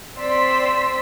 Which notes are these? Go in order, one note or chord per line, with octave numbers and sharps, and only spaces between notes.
C4 D5 C6 E6 B6